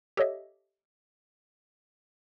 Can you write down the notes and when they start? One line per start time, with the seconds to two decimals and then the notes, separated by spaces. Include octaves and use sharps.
0.17 G4 A4 C#5 D#5 E5